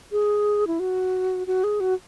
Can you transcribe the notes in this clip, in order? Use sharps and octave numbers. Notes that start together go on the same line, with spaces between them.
G#4
E4
F#4
F#4
G#4
F#4